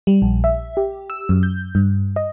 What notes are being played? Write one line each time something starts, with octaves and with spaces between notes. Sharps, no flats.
G3
A#1
E5
G4
E6
F#2
G6
G2
D#5